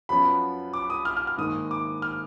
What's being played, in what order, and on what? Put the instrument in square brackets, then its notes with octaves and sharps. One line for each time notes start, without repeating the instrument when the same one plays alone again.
[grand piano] F#2 F3 B3 B5
D6
D#6
F6
F6
F6
G#2 D#3 A#3 D#6
D6
F6